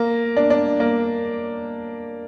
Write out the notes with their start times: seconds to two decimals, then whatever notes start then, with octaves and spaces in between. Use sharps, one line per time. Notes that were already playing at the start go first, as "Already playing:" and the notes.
Already playing: A#3
0.36 D4
0.50 D4
0.80 A#3